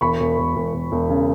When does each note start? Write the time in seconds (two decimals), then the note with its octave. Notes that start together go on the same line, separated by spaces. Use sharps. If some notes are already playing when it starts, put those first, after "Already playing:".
0.01 E1 B5 C#6
0.20 E1
0.38 E1
0.56 E1
0.73 E1
0.92 E1
1.10 C#3